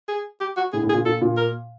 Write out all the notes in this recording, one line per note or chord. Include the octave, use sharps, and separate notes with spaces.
G#4
G4
F#4
A2 G#4
A2
G#4
A#2
A#2 A4
A#2
A#4